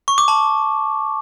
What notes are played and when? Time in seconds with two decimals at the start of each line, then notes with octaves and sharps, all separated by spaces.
0.08 C#6
0.18 D6
0.28 A5